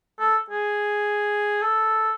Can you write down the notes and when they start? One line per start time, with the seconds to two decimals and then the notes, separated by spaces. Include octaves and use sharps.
0.19 A4
0.50 G#4
1.62 A4